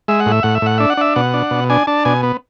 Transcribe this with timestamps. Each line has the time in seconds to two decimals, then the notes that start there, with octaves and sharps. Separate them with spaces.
0.08 G#3 E5
0.20 F#5
0.26 A2
0.31 E5
0.43 A2 F#5
0.55 E5
0.62 A2 F#5
0.78 D4 E5
0.90 F#5
0.97 D4 E5
1.16 B2 F#5
1.34 D4
1.51 B2
1.70 D4 G#5
1.87 D4 A5
2.05 B2 G#5
2.23 B3